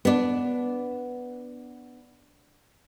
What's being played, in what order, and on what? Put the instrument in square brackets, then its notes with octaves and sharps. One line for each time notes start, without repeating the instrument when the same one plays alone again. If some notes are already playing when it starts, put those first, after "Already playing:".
[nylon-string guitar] B3 D4